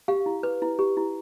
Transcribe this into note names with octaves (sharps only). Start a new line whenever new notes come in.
G4 F5
E4
B4
E4
G4
E4